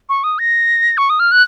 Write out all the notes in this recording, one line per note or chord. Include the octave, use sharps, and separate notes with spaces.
C#6
D#6
A#6
C#6
D#6
F6
F#6